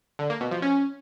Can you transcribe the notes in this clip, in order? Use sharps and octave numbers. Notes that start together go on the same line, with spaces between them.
D3
A#3
B2
F3
C#4